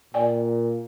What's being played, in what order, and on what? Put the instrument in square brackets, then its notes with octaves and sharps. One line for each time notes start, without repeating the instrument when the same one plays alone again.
[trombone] A#2 [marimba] D5 G5 G#5